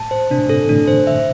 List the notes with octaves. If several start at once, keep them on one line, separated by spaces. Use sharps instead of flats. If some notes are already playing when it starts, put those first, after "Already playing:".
Already playing: A2 A5
C5
C3 D4
A2
G2 C3 A4
E3
A2 D3 D4
C5
E5